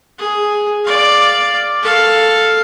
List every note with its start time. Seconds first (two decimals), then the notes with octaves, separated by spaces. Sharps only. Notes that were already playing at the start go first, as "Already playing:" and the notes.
0.19 G#4
0.85 D5 F5
1.82 A4 F5